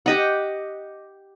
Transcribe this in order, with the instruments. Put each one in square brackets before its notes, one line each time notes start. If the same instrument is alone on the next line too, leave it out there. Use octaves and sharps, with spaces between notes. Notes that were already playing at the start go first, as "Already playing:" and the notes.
[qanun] G4 D#5 F#5